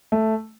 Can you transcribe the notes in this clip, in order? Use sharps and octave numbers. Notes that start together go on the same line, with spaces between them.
A3